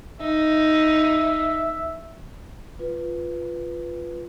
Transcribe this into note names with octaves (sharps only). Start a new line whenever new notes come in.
D#4 E5
F4 B4